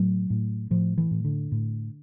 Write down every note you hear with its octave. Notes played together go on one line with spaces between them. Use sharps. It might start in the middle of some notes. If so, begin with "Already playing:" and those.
Already playing: A2 F#3
A2
A2 F3
E3
A2
D3
A2